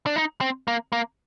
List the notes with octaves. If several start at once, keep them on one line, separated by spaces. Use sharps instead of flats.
D4
D#4
C4
A#3
A#3